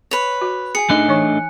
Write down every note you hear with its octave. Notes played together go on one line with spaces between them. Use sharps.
B4 C#5
F#4
G#4 G#5 C#7
A3 D4 D#4 D#5 F#6
E3 C#5 C#6